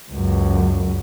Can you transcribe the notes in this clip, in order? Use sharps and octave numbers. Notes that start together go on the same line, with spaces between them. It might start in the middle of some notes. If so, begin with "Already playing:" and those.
C#2 F#2